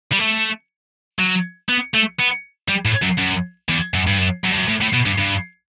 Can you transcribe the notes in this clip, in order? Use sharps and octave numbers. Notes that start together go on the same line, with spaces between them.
G3
A3
F#3
B3
A3
B3
G3
A2
F#2
F#2
E2
F#2
G2
F#2
F#2
G2
F#2
A2
A2
B2
G2
G2